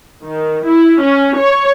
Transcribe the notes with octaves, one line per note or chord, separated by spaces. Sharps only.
D#3
E4
C#4
C#5